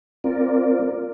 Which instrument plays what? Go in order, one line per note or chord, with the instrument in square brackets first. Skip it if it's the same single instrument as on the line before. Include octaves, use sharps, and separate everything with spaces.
[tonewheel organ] C4 F4 A#4 D5